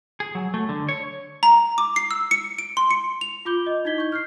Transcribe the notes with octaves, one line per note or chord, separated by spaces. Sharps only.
G#4
F#3
A3
D3
C#5
A#5
D6
C7
E6
C#7
D7
C6
C#7
F7
F4 B5 D6 G6 G7
D#5
D#4 E4 G#6 B6 G7
C#6 G6
F6 G6 C7